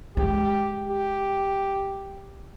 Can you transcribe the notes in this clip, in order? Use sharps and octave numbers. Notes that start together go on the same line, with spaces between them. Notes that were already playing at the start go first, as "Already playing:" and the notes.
G#3 G4
G4